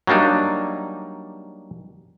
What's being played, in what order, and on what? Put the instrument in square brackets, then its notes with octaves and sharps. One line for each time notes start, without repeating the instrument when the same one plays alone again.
[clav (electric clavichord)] F#3 G3 A#3 D4 D#4